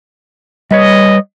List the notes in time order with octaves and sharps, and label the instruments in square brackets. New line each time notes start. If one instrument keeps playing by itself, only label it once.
[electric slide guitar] G3 B4 C#5 [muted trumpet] D#5